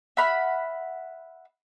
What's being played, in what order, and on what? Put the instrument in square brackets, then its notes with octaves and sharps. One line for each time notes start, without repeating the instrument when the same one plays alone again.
[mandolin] E5 F#5 B5 F6